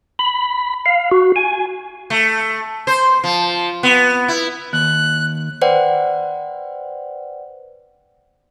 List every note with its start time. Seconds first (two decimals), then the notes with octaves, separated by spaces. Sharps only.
0.19 B5
0.86 F5
1.12 F#4
1.36 G#5
2.10 A3
2.87 C5
3.24 F3
3.83 B3
4.28 E4
4.73 D#2 F#6
5.61 B4 C5 D5 F#5 G5